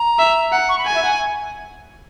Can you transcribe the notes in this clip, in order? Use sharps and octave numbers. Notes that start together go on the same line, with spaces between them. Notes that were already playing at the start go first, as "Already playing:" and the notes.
Already playing: A#5
E5
F#5
C#6
B5
G#5
E5
F#5